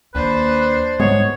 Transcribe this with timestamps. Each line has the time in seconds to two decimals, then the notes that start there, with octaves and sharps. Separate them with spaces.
0.15 D#2 D4 B4 C5
1.00 G#2 G3 G#3 B3 C#5